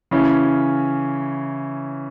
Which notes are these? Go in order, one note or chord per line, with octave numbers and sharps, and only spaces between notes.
C#3 E3 C#4